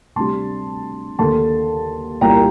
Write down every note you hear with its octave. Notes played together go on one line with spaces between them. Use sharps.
D2 C3 G3 D4 A5 C6
D#2 D3 A3 A5 C6
C2 A#2 G3 A#3 G5 A#5